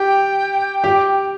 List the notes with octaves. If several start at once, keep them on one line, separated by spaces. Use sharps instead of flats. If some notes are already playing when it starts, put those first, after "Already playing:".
Already playing: G4 G5
G4